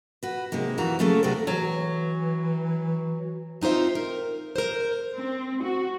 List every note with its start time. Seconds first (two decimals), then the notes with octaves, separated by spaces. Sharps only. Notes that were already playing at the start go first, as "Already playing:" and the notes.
0.23 F#4 B4
0.52 C3 D#3 G#3 A#3
0.78 F2 E3 B3 F#4 A#5
0.99 C#3 F#3 A3 A#3 G#4 A4
1.23 D#2 C3 F#4 G#4 D5
1.47 E3 F#3
3.61 C4 D#4 F4 C5 E5
3.95 A#4
4.56 A#4 C5
5.16 C4
5.63 F#4